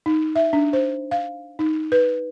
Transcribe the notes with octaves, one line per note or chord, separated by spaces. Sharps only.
D#4
E5
D4
C5
F5
D#4
B4